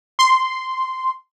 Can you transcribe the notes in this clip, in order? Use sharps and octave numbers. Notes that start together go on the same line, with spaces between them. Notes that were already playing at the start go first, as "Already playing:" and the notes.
C6